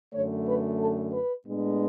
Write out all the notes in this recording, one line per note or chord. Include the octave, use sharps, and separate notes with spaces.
F#2 D3 A3 C#5
B4
A4
B4
A2 G#3 B3 D4